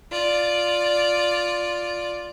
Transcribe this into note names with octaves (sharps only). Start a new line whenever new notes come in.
F4 D5